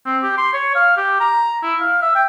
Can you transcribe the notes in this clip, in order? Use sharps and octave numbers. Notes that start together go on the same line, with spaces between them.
C4
G4
C6
C#5
F5
G4
A#5
E4
F5
E5
G5